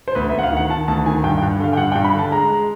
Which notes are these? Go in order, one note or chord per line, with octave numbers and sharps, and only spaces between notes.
C5
D2 B4
E5
D2
F#5
F5
D#3
F#5
D#3 A5
D2 A5
D#3 G#5
G2 G5
G5
G2
D3 F5
G5
G2 F#5
G5
G2
B5
D3 A5
G#3 A#5
G#3